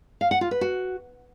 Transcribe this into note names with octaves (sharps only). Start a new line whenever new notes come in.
F5
F#5
F4
B4
F#4